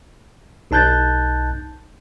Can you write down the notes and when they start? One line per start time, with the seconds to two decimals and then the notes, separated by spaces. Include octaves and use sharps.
0.71 B1 D#4 A5 F#6 G6 A6